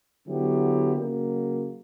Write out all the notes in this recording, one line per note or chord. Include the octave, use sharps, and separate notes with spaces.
D3 F#3 B3 E4 G4
C#3 F#3 A#3